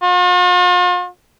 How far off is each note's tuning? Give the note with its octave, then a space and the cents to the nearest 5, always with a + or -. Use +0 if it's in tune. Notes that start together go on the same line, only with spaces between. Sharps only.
F4 +45